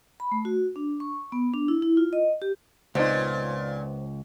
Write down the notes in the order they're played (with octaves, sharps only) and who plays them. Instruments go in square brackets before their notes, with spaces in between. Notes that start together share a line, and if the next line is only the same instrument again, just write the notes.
[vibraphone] B5
A3
F#4
D4
C#6
B3
D4
E4
E4
F4
D#5
G4
[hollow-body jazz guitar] C#2 [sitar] A#2 [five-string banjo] B3 C4 D#4 [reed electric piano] C5